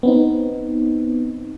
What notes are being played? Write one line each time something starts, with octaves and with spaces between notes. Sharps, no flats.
B3 C4 D#4